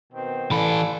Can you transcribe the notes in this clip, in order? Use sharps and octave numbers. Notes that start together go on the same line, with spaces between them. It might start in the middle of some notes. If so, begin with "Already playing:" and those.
B2 D#3 C4
E3 A4 D5 F5 G#5 B5